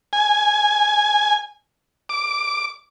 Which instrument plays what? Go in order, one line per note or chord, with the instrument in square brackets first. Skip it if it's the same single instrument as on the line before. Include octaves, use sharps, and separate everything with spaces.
[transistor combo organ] G#5
D6